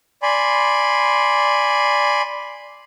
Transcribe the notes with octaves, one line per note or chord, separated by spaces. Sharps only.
D5 G#5 B5 C6